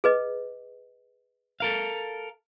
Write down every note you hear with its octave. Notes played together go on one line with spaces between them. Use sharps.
G#4 B4 D#5
A4 A#4 F5